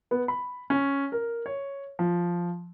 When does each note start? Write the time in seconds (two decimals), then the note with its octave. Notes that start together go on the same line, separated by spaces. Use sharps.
0.11 B3
0.28 B5
0.70 C#4
1.12 A#4
1.46 C#5
1.99 F3